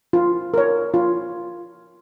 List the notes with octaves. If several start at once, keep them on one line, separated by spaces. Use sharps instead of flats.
F4
A#4 C#5
F4